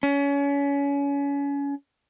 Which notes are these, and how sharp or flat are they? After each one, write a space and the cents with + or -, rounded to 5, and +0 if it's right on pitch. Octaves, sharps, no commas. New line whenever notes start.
C#4 +30